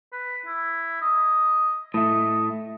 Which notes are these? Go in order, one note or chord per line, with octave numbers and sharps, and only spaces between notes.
B4
E4
D#5
A2 A3 D#5